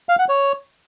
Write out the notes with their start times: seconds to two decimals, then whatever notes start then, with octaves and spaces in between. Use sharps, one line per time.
0.09 F5
0.19 F#5
0.29 C#5